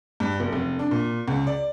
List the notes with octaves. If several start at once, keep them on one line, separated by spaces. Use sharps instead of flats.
G2
F#1
F1
D4
A#2
C#2
D5